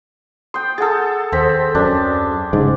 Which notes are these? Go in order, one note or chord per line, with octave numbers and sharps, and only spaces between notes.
G5 C6 D#6
G#4 A4 F#5 A6
D#2 C4 A4 B6
F#2 D4
G#2 C#3